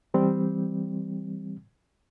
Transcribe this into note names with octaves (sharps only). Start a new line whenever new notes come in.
E3 G3 C4